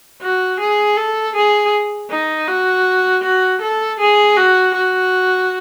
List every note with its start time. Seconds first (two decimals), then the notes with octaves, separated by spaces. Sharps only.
0.22 F#4
0.60 G#4
0.97 A4
1.35 G#4
2.11 D#4
2.48 F#4
3.23 F#4
3.61 A4
4.00 G#4
4.37 F#4
4.74 F#4